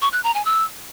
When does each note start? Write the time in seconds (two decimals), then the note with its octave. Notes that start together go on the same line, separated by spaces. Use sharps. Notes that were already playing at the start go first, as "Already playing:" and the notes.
0.02 C#6
0.13 F#6
0.24 A#5
0.34 G#5
0.45 E6